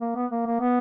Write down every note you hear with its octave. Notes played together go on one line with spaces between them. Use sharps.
A#3
B3
A#3
A#3
B3